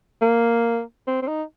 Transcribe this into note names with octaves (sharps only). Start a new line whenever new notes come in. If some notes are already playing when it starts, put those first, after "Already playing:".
A#3
C4
C4
D#4